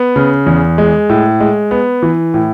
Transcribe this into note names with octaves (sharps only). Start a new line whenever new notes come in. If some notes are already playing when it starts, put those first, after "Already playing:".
Already playing: B3
C#3
E2
G#3
A2
G#3
B3
E3
A2